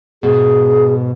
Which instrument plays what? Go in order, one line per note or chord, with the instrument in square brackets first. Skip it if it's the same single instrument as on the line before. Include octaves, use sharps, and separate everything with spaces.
[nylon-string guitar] G#2 B2 [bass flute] G#4